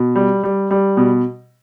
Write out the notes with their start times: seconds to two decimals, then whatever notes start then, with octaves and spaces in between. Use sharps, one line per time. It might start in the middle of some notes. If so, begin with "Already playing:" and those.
Already playing: B2
0.16 G3
0.43 G3
0.71 G3
0.97 B2